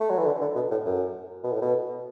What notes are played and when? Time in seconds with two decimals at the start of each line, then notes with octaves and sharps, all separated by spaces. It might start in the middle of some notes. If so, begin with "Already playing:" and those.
0.01 A3
0.10 F#3
0.18 E3
0.26 D3
0.41 D3
0.55 B2
0.71 A2
0.85 F#2
1.44 B2
1.53 A2
1.61 B2